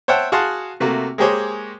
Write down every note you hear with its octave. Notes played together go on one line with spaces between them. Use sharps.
C5 C#5 E5 F#5 G5 A5
F#4 G#4 F5 F#5 A5 C6
C3 A3 A#3 F#4
G#3 A#3 G4 G#4 C5 C#5